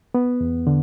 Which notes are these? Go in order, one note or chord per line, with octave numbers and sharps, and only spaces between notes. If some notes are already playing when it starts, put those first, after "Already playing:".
B3
E2
D3